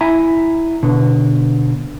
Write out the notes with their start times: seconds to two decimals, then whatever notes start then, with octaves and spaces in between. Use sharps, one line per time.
0.01 E4 E5 G#5 A#5
0.83 B2 D3